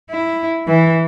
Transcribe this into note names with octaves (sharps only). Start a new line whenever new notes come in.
E4
E3